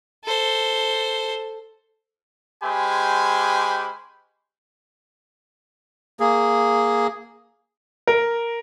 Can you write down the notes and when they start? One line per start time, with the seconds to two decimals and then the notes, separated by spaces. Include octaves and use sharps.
0.24 A4 C5
2.63 G#3 C#4 G4 C5 G#5 B5
6.20 A#3 G#4
8.07 A#4